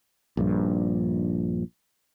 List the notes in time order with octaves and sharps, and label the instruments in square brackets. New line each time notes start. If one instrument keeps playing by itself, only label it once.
[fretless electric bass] A#1 G2